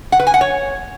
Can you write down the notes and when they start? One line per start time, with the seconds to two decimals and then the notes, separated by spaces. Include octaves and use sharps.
0.12 F#5
0.20 B4
0.27 G#5
0.34 F#5
0.41 C#5